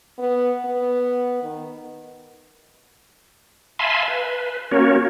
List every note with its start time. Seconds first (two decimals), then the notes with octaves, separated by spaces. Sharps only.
0.19 B3
0.65 B3
1.43 D#3
3.79 E5 F5 G#5 A5 B5 C6
4.08 B4
4.71 A#3 C#4 F#4 A#4 C#5